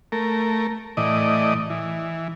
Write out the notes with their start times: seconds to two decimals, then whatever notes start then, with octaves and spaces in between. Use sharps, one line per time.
0.12 A3 A#4
0.97 A2 E3 D5 D#5
1.70 E3